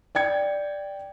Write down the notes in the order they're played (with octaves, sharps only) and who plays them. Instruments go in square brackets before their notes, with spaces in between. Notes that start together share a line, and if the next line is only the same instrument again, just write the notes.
[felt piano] D5 G5 G#6 C#7